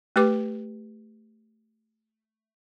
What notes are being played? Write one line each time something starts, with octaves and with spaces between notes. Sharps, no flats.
A3 G4 B4 D6